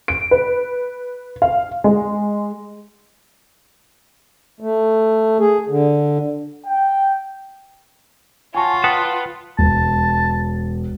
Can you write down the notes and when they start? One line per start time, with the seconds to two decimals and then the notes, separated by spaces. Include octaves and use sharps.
0.08 D7
0.31 B4
1.42 F5
1.84 G#3
4.60 A3
5.40 G#4
5.69 D3
6.66 G5
8.55 F4 F#4 C#5 G#5 A5
8.84 B4 F#5 G5 A5 D#6
9.58 E1 A5